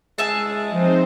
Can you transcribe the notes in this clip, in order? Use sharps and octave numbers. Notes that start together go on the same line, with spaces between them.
G#3 G#4 E5 A5
F3 C4 D#4 C5